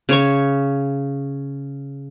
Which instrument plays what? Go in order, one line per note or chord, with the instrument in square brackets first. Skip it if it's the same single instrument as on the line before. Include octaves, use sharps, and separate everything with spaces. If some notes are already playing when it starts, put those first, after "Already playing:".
[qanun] C#3 C#5 C#6